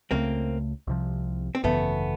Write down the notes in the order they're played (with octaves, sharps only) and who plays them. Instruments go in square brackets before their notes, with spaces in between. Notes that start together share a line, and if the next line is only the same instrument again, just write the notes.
[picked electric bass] C#2 C#3 F3 A3 [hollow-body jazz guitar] A#3 C4
[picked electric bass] C2 C3 F3
[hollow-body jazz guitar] C4
[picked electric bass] G#1 F#2 C#3 E3 [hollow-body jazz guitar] A3 B3